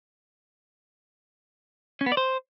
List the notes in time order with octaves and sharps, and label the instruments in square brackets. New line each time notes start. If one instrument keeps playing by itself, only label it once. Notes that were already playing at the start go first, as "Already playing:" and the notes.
[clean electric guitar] C#4
B3
D5
C5